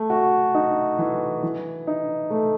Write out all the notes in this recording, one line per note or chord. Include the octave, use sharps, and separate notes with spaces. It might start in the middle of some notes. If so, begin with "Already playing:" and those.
Already playing: A3
F#4
D#4
E3
E3
D#4
A3